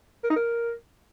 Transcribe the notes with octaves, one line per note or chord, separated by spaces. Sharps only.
A#4
D#4
A#4